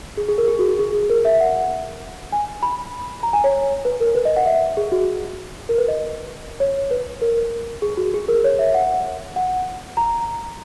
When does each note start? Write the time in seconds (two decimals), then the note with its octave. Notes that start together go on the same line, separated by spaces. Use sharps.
0.17 G#4
0.28 G#4
0.38 A#4
0.48 G#4
0.59 F#4
0.69 G#4
0.79 G#4
1.10 A#4
1.25 E5
1.40 F#5
2.32 G#5
2.63 B5
3.23 A#5
3.33 G#5
3.44 C#5
3.85 B4
4.00 A#4
4.15 B4
4.25 D#5
4.36 F#5
4.45 E5
4.77 G#4
4.92 F#4
5.69 A#4
5.78 B4
5.88 D#5
6.60 C#5
6.91 B4
7.22 A#4
7.82 G#4
7.97 F#4
8.14 G#4
8.28 A#4
8.44 C#5
8.59 E5
8.74 F#5
9.36 F#5
9.97 A#5